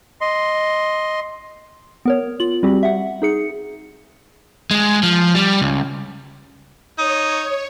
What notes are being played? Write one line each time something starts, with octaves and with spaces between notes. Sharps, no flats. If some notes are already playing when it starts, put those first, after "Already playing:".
D#5 C6
B3 A#4 C#5
F4 F#7
G3 C4 F#4 G4
E5 F#5
D#4 G#4 C#7
G#3
F3
G3
C#2
D#4 C#5